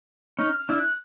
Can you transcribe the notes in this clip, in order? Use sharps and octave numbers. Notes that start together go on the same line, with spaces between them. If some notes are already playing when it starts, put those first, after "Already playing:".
C#4 D#4 F6
F6
D4 E4
F#6